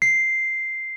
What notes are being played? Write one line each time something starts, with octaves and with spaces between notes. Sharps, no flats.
C7